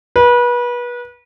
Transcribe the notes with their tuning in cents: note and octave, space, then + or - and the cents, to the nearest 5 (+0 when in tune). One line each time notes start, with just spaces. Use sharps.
B4 -30